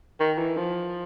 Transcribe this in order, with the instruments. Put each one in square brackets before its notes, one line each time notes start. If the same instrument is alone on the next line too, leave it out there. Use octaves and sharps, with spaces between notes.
[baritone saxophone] D#3
E3
F3